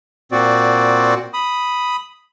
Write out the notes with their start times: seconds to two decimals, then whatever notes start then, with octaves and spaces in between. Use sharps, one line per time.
0.32 A#2 C4 F#4 D5
1.34 B5 D#6